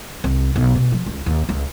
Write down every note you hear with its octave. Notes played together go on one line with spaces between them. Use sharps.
C2
B1
B2
F3
C#2
D#2
C#2